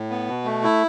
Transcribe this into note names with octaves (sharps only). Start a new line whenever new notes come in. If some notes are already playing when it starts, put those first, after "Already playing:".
Already playing: A2
B3
B2
A3
E4